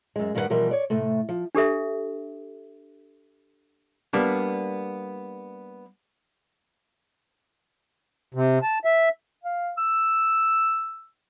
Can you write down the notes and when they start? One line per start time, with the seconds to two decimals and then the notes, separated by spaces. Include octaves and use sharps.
0.16 F#2 G#3
0.35 G2 D#3 G3 E4 B4 F#5
0.50 B2 E3 F3 G3 A#4
0.71 C#5 D5
0.90 A2 C3 A3
1.29 F3
1.55 D4 G4 A4 E5
4.13 G3 A#3 B3 D4
8.34 C3
8.63 A5
8.85 E5
9.44 F5
9.78 E6